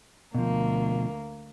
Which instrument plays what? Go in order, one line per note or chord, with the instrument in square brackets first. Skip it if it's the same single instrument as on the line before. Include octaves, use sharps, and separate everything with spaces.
[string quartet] D2 A#3 [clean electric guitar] B2 F3